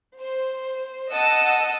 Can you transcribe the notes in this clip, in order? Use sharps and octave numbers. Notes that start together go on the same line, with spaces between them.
C5
D#5 F#5 A5 E6